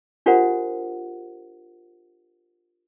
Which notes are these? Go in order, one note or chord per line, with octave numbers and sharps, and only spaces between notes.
D4 F4 G4 A#4 C5 F#5